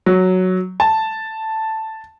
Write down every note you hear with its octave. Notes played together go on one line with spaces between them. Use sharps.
F#3
A5